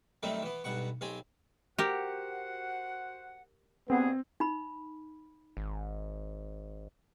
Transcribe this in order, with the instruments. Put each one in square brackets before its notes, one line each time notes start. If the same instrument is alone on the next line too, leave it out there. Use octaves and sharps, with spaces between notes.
[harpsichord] F#2 D#3 G3 A3 C4
E3 B3
B1 G2 B2 F#5 C#6
B1 C4 G4 G#5
[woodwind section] F#4 C5 F#5 [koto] G4 A#4
[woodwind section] G2 B2 G#4 [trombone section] B3 [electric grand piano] C4
[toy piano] D#4 B5
[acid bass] G#1